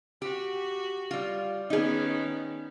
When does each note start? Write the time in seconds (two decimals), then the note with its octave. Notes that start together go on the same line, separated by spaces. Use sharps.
0.22 F#4 G4
1.11 G3 F4
1.70 D#3 B3 C#4 D#4 G#4